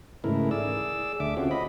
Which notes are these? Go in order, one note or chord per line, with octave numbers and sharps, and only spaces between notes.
G#2 C#3 E3 A3 E4 A#4
G#4 D5 E6
D2 D3 E5 D6
C4 C#4 F4 F#4
D#5 B5